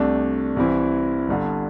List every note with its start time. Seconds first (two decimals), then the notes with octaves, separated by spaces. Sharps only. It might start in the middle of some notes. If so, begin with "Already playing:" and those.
Already playing: C2 C3 A3 D4
0.56 C2 C3 E3 C4 E4
1.28 G1 G2 D3